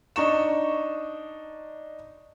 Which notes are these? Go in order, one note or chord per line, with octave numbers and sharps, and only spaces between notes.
D4 D#4 C#6 E7